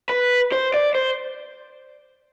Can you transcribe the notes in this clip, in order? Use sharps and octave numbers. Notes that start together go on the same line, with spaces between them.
B4
C5
D5
C5